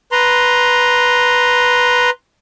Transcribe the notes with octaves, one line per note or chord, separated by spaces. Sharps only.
B4 A#5 C6